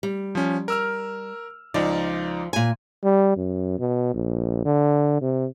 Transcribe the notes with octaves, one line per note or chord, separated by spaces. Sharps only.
G3
F3 C#4
A#4 E6 F6
C#2 F3 D#4 D5
A#2 G#5
G3
F#2
B2
A#1
D3
C3